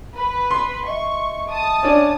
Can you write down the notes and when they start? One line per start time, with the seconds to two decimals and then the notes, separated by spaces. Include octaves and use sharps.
0.16 B4
0.51 C6
0.87 D#5 E5 C#6
1.50 A5 D#6
1.83 C#4 D4